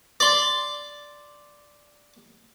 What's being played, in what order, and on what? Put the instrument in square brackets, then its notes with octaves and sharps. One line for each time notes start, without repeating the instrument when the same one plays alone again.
[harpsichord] D5 C6